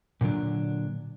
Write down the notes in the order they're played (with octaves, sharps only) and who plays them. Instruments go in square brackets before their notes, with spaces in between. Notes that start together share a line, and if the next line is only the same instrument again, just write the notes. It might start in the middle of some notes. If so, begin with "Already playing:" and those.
[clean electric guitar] A#2 D3 F#3 D4